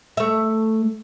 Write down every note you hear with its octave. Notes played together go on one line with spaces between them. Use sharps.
A3 E5